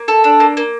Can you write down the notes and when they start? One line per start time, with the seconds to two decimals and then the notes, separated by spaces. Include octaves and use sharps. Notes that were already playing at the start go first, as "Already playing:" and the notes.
Already playing: A#3
0.08 A4
0.24 D4
0.40 A#3
0.57 A#3